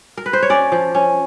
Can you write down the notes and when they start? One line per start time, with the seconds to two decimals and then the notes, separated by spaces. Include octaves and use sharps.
0.17 A#4
0.26 B4
0.33 C5
0.42 C#5
0.50 C#4 D5
0.72 F3
0.95 C#4